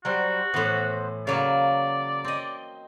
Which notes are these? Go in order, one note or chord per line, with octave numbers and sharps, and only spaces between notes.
F#3 G3 F#4 C5
A2 E3 B3 C5
C#3 F#3 A#3 D5 F5
C4 D#5